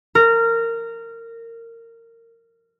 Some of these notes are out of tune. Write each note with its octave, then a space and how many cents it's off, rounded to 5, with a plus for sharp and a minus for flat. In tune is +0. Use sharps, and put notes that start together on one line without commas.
A#4 -20